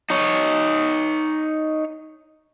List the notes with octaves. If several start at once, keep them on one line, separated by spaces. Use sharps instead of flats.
D#4 C#5